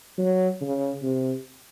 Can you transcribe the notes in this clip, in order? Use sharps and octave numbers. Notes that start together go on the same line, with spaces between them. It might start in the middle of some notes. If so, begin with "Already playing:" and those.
F#3
C#3
C3